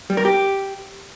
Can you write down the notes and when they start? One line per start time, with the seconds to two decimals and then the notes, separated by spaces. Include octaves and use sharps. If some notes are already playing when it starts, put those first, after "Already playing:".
0.10 G3
0.17 A#4
0.25 G4